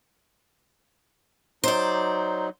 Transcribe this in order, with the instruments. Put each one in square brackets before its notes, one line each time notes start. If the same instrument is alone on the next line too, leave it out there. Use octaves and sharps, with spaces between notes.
[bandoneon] F#3 D#4 [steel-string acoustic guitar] C5 D5